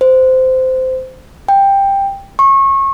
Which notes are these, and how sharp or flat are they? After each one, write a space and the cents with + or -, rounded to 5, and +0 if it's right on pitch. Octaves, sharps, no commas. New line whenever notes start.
C5 -15
G5 +10
C#6 -25